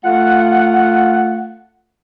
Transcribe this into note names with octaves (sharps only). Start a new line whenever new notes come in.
A3 F4 F#5